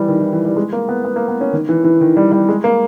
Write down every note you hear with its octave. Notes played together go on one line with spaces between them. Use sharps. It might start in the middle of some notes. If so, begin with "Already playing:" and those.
Already playing: E3 G3
D#3
E3
E3
G3
G#3
A#3
B3
B3
A#3
B3
C#4
D#3
E3
E3
D#3
G3
G3
G#3
A#3